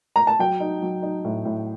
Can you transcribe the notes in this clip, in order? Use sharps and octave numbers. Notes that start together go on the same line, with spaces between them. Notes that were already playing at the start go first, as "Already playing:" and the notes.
A#5
A5
F#3 G5
D#4
F#3
D#4
A2
A2